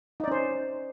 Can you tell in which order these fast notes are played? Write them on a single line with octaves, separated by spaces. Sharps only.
D#4 D5 C#4 C5